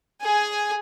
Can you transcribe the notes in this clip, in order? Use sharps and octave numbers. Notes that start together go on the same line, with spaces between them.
G#4 G#5